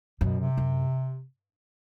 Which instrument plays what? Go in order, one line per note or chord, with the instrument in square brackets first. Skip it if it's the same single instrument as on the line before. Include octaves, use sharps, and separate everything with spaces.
[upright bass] F#2 [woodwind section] B2
[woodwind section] C3
[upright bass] F#2